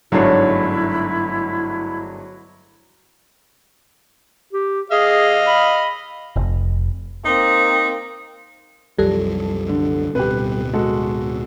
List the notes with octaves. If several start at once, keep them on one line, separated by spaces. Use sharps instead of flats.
G1 G#2 F#3 A3 D4 E4 C#5 F5
G4
G#4 D#5 F5
B5
F1
A#3 C4 D#4
C2 F#2 F3 G3 A4
D3
D1 B2 C4 G4 B4
G#3 F#4 A4